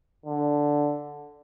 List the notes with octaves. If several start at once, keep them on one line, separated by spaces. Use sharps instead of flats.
D3